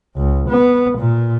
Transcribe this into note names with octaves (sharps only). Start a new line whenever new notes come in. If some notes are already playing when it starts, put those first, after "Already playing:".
C#2
B3
A#2